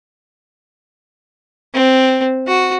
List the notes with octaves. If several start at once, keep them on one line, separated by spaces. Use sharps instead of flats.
C4
F#4